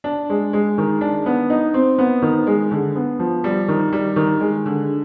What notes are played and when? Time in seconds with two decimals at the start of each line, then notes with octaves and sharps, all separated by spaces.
0.04 D4
0.30 G#3
0.53 G#3
0.78 D#3
1.01 D4
1.26 B3
1.50 D#4
1.74 C4
1.98 B3
2.22 D#3
2.47 G#3
2.71 D3
2.96 B3
3.19 F3
3.44 G3
3.68 D#3
3.92 G3
4.16 D#3
4.41 G#3
4.66 D3